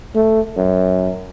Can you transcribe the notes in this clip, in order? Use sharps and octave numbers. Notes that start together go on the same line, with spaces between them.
A3
F#2